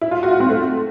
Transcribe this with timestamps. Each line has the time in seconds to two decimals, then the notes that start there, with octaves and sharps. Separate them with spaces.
0.01 E4
0.11 F4
0.23 F#4
0.31 F4
0.40 C4
0.50 A3